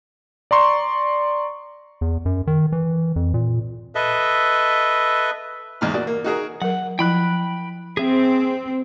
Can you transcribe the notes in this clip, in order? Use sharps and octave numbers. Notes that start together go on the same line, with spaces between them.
D5 A#5 C6 C#6
E2
F#2
D#3
E3
F2
A#2
A4 B4 D#5 E5
E2 G#2 F6
A#2 F#4 D5
A#3
D#4 F#4 G#4 A#4
F#3 A#4 F#5
F3 E4 G5 B5 F#6
C4 G#4 E5